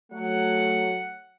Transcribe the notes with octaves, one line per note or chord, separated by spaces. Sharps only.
F#3 A3 F#5